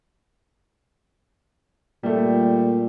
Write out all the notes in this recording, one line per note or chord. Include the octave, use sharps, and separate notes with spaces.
A#2 G3 A3